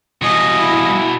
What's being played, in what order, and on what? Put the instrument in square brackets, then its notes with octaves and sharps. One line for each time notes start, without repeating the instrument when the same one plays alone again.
[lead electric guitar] B2 G#4 [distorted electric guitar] E3 G3 [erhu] D#5
[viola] E4